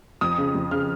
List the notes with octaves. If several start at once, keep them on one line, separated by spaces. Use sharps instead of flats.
F2 D#6
C#3
F2
C#3 F6